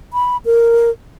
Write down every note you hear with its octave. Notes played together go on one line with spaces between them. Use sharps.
B5
A#4